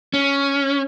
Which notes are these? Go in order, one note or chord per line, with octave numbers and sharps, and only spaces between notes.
C#4